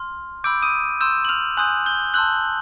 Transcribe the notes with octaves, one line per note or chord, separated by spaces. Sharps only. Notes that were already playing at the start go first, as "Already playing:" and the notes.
Already playing: C6 F6
B5 D6 E6 G6 D7
D#6 D#7
C6 E6 G6 E7
F#7
F6 F7
G#5 C6 D#6 F#6 G6 F#7
G6 G7
A5 C6 E6 F#6 G6 F#7